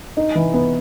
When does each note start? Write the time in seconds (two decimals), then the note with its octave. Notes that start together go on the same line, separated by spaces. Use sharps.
0.17 D#4
0.35 E3
0.54 B3